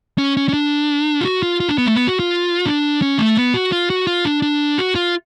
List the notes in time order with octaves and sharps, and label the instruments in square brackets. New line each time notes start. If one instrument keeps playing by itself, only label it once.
[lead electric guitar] C#4
C#4
C#4
D4
F4
F#4
F4
F4
D4
B3
A3
B3
F#4
F4
D4
C#4
A3
B3
F#4
F4
F#4
F4
D4
D4
F#4
F4